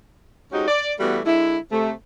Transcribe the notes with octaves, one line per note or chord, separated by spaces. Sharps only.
G#2 C#4 D#4 F#4 G4
D5
E3 G3 A3 B3 F#4
D3 G#3 E4
C3 A3